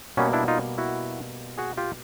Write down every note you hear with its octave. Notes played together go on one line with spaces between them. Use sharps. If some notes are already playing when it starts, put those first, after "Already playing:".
B2 G3 A#3 B3 C#4
D4 E4
D#4 F4
E4 F#4
F#4 G#4
F4 G4